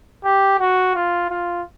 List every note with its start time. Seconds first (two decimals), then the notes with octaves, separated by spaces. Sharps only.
0.24 G4
0.59 F#4
0.95 F4
1.30 F4